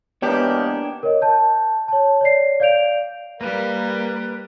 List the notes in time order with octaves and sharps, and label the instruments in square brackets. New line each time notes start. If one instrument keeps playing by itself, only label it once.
[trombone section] E3 G#3 A#3 [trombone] B3 [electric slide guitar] D4 C#5 [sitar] G4
[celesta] A#4 C#5 D#5
A5 G6
C#5 A5
C#5 D5 C7
D5 F5 G6 D7 F7
[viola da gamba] G3 [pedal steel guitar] A#3 [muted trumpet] A#4 [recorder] B4